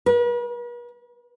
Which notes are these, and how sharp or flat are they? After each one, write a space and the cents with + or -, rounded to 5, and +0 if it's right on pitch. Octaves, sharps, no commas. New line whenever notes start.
B4 -45